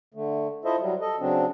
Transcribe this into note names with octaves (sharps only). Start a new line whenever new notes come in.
D3 A3
E4 F4 A4 C5 D#5 E5
F#3 G3
A4 D#5
C#3 F#3 C4 D4